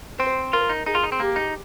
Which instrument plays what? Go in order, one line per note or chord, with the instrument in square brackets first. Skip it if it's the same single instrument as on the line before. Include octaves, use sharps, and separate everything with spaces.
[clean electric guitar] C4 [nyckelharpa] C5
[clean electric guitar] F4 [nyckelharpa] A#4
[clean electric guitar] D#4
[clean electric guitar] D#4 [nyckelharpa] G#4
[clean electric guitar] F4
D#4
C4
[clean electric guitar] A#3 [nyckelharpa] G4
[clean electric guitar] D#4